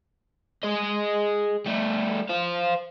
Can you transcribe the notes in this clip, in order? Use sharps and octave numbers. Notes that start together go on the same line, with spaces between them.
G#4 D#5
G3 A3
C5 F5